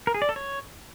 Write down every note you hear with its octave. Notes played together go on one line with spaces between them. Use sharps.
A#4
G#4
D5
A4
C#5